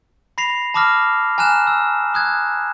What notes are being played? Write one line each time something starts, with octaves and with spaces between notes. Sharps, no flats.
B5 A#6 C7 F7
A5 B5 D6 D#6 F6 A#6
G#5 A#5 F6 F#6 E7
E6
D#6 F#6 G#6